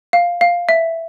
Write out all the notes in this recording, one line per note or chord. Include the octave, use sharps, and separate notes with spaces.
F5
F5
E5